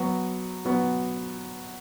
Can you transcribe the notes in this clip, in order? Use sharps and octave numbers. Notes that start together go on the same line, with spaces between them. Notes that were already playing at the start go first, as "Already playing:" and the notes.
Already playing: F#3 B3 F#4
F#3 B3 F#4